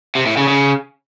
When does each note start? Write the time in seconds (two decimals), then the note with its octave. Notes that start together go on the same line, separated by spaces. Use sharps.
0.15 C3
0.26 A2
0.37 C#3
0.48 C#3